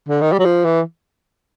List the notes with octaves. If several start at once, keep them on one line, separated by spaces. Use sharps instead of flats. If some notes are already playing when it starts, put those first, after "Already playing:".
D3
D#3
G3
F#3
F3
E3